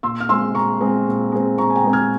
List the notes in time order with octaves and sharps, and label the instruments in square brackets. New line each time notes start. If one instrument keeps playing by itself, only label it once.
[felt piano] A#2 C6 E6
F6
G#3 C4 C6 E6
A#2 A#5 C#6
G#3 C4
A#2
G#3 C4
A#2 A#5 C#6
G#5
G5 A#5
G#3 C4
F6 G#6